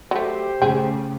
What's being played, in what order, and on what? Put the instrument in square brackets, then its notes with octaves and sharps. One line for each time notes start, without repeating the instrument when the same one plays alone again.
[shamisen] F#3 A3 [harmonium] G4 C5
[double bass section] C#3 A3 [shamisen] G#4 G5